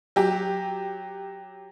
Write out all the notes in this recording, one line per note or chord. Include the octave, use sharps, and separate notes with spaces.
F#3 G4